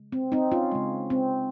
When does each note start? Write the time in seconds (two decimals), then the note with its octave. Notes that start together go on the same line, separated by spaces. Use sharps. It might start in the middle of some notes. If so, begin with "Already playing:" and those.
Already playing: C#3 G#3
0.12 C4
0.32 C4 D#4
0.52 C#4 F4
0.72 C#3 G#3
1.10 C4